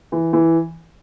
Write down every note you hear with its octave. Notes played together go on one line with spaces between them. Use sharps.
E3
E3